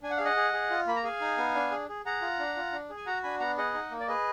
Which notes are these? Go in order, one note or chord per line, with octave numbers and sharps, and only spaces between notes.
D4 G#5
F#5
G#4 F5
D#5 F#5
G#4
G#4
F4
A#3 B5
A#5
G#4 F5 G#5
D#4
B3
D4
G#4
G#4
G#4 F#5 A#5
F4
D4
F4
D4
G#4
G#5
F#4 F#5 A#5
D4 G#5 B5
B3 F#5 A#5
G#4 D#5 F#5
D#4
A#3
D5
G#4 B4 D#5